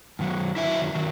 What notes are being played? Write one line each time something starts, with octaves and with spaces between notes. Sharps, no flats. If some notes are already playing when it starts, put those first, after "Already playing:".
F#2 D#3 F#3
F#2 D#3 F#3 E4 E5
D#3 F#3